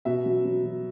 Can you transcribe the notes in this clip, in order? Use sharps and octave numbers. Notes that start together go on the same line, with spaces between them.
B2 E5
F#3
F#3
F#3